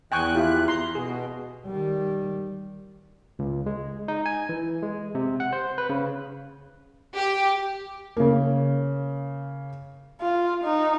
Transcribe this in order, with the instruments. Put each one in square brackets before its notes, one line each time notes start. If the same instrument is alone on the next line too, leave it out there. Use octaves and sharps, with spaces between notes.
[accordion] E2 F#6 [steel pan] G5 G#5 C#6
[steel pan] E4 F4 G4
A#5 C6
[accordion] B2 [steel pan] G#4
[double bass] D#3 G3
[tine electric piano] C#2
G#3
D#4
G#5
E3
G#3
C3
F#5
C5
B4
C#3
[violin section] G4
[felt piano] C#3 A#3
[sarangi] F4
D#4